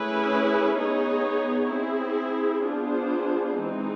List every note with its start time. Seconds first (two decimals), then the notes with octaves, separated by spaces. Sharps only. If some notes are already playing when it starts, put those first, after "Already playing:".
Already playing: A3 C#4 E4 G#4 B4
0.77 B3 D#4 G#4 C#5
1.71 C4 E4 G#4
2.64 B3 D4 F4 G#4 C5
3.57 E3 G#3 C4 D#4